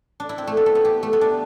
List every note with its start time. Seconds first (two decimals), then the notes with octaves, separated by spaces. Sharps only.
0.20 D4
0.29 E4
0.38 C4
0.47 A3
0.57 B3
0.66 A3
0.75 B3
0.85 G4
1.03 A3
1.13 B3
1.21 D4